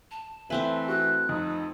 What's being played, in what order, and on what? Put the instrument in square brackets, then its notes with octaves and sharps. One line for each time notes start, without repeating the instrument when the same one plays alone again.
[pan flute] A5
[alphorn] E3 [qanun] A3 C4 B4 [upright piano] E5 G#5
[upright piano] F#4 [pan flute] F#6
[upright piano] F2 [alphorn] D#4